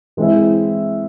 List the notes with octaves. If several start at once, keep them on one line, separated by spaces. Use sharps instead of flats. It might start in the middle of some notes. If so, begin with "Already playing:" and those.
E3 G#3 C4 E4